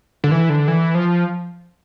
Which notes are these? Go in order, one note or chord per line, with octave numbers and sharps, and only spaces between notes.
D3
E3
D3
E3
F3